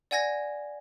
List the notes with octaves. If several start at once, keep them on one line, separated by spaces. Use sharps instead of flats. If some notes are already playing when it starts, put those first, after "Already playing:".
D5 F#5 G#5 G#6 A#6